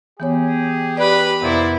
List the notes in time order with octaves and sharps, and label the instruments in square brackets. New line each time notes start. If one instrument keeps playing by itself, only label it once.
[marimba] E3 B3 C#5 [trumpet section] G4 G#4
[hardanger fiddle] G4 B5 [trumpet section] B4 [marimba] D5
[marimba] F2 C3 A#4 [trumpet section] A#3 C5 D5 [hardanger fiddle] B3 E4